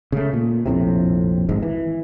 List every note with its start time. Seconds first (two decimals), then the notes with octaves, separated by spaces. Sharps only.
0.12 C#3 A3
0.33 A#2
0.66 A#1 F2 A2 C3
1.49 G#1 G#2
1.62 E3